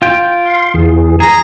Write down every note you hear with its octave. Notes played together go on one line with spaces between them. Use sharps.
F4 G5
F5 C6
E2 E3 G#4
G#4 A#5